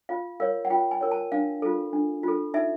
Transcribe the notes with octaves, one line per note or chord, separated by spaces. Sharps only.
F4 F5
A#4 C#5 F5
F#5
F4 G5
G#5
A#4 C#5
A5
D4 F5
F4 A4
D4
F4 A4
D#4 E5